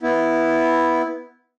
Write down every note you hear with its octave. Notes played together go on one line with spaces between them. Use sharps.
B3 E4